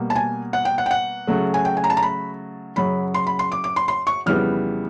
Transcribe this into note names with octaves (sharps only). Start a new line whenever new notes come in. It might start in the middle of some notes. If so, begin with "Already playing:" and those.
Already playing: B2 G3 A#3
A5
G#5
F#5
G5
F#5
G5
F#5
C#3 F#3 A3
G#5
G5
G#5
A#5
A5
A#5
B5
F#2 C#3 F#3 B5
C6
B5
C6
D6
D6
C6
C6
C#6
F2 C#3 E3 G3 B3 F6